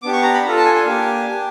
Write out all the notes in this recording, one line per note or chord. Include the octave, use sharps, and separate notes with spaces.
B3 D4 G4 D6
C#6
A#5
B5
D4 F4 A4 A#5
A5
G#5
G#5
A#3 D4 G4
D4 G4